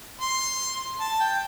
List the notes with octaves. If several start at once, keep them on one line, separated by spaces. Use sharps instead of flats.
C6
A5
G5